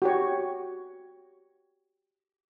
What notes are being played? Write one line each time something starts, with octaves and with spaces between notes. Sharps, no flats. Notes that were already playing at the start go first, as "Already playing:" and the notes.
F#4 G4 C#5